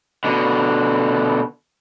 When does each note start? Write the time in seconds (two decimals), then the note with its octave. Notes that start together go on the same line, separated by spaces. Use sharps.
0.24 B2 D3